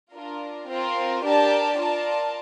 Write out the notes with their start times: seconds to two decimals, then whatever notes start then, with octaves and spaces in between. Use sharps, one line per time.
0.15 D4 F4 A#4
0.70 C4 F4 A#4
1.25 D4 G4 A#4 D5 A5
1.79 F4 A#4 D5 A5